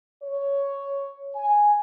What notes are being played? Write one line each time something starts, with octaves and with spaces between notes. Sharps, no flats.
C#5
G#5